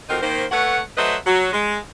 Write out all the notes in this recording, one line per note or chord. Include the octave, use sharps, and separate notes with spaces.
F2 C4 D#4 F4 F#4 A#4
D#3 A#3 C5
A3 A4 B4 C#5 F#5
F#3 A3 B4 C5 D#5 E5
F#3
G#3